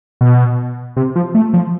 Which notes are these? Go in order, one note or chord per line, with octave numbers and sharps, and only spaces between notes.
B2
C3
F3
A3
F3